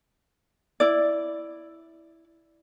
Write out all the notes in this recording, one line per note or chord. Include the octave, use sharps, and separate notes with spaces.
E4 D5